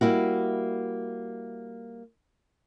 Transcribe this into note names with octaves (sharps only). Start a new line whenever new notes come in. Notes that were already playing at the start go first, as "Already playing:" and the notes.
G3 A#3 E4 F#4